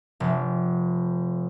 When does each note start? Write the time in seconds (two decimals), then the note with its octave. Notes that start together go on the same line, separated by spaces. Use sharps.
0.20 F1